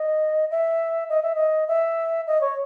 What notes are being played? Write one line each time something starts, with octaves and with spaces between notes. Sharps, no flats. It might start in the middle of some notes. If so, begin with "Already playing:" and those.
Already playing: D#5
E5
D#5
E5
D#5
E5
D#5
C#5